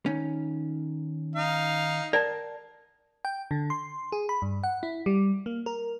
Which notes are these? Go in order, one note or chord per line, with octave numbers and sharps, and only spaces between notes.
D#3 C#4
D#4 F5
A#4 D5 G5 A5
G5
D3
C6
G#4
B5
G2
F#5
E4
G3
A#3
A#4